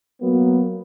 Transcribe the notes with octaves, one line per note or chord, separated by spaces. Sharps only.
F#3 A#3 B3